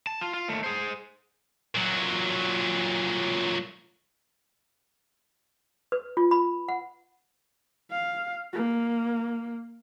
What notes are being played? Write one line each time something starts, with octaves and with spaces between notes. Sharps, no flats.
A5
F4
F4
D#2 A3
G#4 C5
A#2 F#3
B4
F4
B5
F#5
F5
A#3